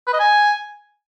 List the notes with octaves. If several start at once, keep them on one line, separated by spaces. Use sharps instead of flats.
B4
D#5
G#5